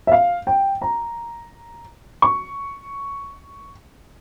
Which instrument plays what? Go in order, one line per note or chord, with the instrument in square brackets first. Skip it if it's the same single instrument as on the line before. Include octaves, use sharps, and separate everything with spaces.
[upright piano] E5
F5
G5
A#5
C#6